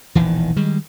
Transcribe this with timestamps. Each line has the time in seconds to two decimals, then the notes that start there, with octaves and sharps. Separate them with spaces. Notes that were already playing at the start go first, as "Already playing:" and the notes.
0.15 E1 A#1 D#3 E3
0.56 D#3 G3 G#3